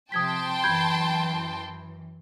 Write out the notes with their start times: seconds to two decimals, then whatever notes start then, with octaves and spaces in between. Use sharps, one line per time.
0.12 C3 F3 G5 A5 C6 D#6 G#6 B6
0.64 F#2 E3 B5 G6 G#6